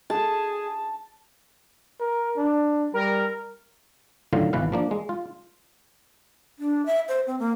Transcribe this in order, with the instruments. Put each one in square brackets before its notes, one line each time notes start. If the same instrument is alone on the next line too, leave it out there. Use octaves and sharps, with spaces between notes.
[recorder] G#4 [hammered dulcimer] A5
[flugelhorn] A#4
D4
[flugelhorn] G3 [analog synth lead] A#4
[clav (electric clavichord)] A2 D3 D#3 F#3 F4 F5
G#1 B2 E3 B4 F5
F3 A#3 D4
G#3
F4
[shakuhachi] D4
E5
C5
C4
A#3